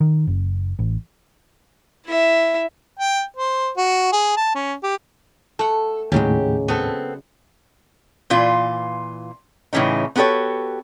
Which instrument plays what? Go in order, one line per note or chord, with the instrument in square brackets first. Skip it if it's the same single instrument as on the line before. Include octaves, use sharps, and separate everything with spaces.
[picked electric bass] D#3
F#1
A1
[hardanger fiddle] E4 E5
[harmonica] G5
C5
F#4
G#4
A5
C#4
G4
[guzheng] A3 F#5 [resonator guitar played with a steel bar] A4
[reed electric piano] D#2 A2 [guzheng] C#3 F#3 G#3 [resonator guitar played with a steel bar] G4
[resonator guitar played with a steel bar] B3 C4 A4
A#2 E3 F4
A2 C#3 E3 C#4 D#4
B3 F#4 G4 A4 C#5